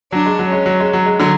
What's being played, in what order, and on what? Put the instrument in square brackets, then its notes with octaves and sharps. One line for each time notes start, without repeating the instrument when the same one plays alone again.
[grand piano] F#3 [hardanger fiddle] D4
[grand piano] G#3
F#3
[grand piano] G#3 [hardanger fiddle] C#4
[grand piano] F#3
G#3
F#3
G#3
D3 F#3